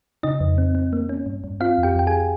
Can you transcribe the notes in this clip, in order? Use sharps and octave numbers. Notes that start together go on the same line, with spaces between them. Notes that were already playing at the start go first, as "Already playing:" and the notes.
C#3 D#4 D#5
F2
C4
C4
A#3
C#4
G2
G2
C4 F4 F5
F2
G4 G5
F2 G5
G#4 G#5